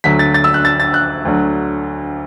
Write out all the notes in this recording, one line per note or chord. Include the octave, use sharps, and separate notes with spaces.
D2 D3 F#3 B6
A6
A6
E6
F#6
A6
A6
F#6
D2 D3 F#3